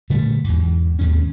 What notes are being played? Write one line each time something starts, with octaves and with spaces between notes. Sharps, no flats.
A#2 D3 G3 A3
E2 G#2
D#2 G#2 B2 C#4